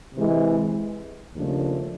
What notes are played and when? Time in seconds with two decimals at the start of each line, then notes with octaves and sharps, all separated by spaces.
0.15 C3 E3 G#3
1.33 D#2 C#3 F3 A3 D4